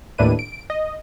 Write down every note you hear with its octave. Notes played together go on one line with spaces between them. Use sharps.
D#2 A2 D4 E4 B4 D#7
D7
D#5